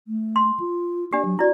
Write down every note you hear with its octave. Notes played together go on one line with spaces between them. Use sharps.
A3
C6
F4
D4 G4 D5
F#3
E4 F#4 D5